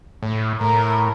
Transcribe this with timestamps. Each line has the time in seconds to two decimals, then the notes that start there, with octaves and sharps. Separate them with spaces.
0.23 A2
0.61 A2 A#4